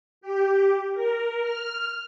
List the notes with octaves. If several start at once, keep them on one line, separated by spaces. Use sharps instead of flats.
G4
A#4
F6